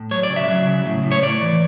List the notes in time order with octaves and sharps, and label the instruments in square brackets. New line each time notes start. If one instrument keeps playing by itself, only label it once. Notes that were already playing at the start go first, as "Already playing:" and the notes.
Already playing: [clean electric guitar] A2
F#3 C#5
D5
C#3
E5
F#3
C#3
A2
A2
C#5
A2 D5
E3